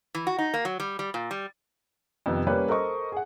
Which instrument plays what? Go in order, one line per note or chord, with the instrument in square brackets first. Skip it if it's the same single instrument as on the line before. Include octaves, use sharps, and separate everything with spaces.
[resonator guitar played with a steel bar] E3
F#4
D#4
A#3
F#3
G3
G3
A#2
G3
[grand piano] F2 C3 D#3 B3
G3 A#3 C#4 B4 C#5
A4 A#4 C5 D#5 C#6
G#4 F#5